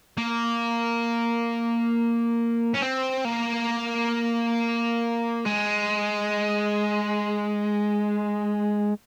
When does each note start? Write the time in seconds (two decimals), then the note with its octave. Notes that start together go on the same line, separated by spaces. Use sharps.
0.18 A#3
2.74 C#4
2.82 C4
3.25 A#3
5.45 G#3